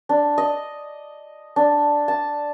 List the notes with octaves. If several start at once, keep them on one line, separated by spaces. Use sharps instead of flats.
D4
D#5
D4
A5